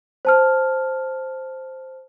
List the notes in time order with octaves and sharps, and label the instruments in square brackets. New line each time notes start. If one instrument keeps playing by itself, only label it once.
[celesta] C5 A5 F6